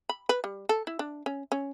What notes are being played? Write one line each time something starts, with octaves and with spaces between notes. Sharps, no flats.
B5
B4
G3
A4
E4
D4
C#4
C#4